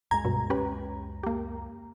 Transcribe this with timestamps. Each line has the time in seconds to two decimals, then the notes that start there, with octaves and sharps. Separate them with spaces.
0.11 C#2 F#2 G#3 A#5 G#6
0.25 G2 B2
0.50 C#4 G4 B4
1.23 A#3 G4